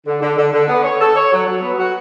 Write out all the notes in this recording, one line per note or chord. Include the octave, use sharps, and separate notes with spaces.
D3
D3
D3
D3
B3
C#5
A4
C#5
F#3
F#3
B3
F#4